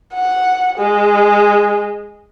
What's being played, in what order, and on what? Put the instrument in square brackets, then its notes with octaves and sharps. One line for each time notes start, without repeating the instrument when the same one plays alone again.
[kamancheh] F#5
G#3